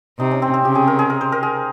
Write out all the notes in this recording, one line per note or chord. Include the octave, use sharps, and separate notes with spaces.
C3 D#4
C#4
C4
C4
C#3 G4
G#4
A#4
G#4
A#4
C5
A#4
G#4